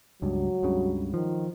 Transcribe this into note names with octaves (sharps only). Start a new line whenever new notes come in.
C#2 G2 F#3
C#2 G2 C#3
D#3 F3